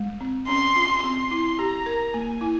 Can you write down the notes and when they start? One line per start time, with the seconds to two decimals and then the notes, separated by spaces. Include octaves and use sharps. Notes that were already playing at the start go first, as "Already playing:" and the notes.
Already playing: G#3
0.21 C4
0.48 C#4 C6
0.76 F4
1.04 C4 C6
1.31 E4
1.59 G4 A#5
1.86 A#4
2.14 A#3 G#5
2.41 E4